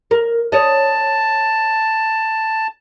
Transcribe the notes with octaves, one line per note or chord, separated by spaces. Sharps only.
A#4
C#5 D#5 A5